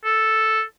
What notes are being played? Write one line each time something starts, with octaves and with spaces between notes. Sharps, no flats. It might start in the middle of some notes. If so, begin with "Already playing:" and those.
A4